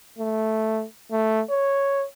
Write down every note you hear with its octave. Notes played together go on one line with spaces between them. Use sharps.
A3
A3
C#5